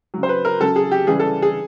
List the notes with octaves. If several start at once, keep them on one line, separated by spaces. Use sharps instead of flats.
C#3 F#3
C5
B4
A#4
C#3 F#3 A4
G#4
G4
C#3 E3 G3 G#4
A4
G#4